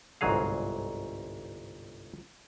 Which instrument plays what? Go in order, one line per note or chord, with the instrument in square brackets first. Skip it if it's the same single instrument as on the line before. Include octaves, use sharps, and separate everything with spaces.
[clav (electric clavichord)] G1 C2 G#2 F#3 G#4 F5